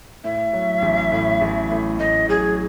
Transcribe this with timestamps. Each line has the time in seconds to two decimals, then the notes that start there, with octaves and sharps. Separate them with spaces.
0.24 A2 E5
0.53 F#3
0.82 A1
1.12 A2
1.41 A1
1.70 A2
1.99 A2 D#5
2.28 F#3 G#4